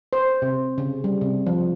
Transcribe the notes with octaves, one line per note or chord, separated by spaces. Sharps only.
C5
C3
C#3
G3
C3
F3